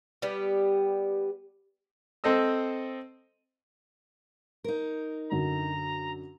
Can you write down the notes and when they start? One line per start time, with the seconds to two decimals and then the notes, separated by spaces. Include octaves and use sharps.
0.22 G3 B3 G4
2.24 C4 A4 C5 D#5 E6
4.64 D#4 A#4
5.31 F#2 D3 A#5